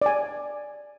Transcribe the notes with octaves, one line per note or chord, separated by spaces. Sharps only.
D5 G#5